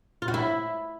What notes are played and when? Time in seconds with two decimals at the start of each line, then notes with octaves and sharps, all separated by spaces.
0.22 F4
0.28 F#4
0.34 E4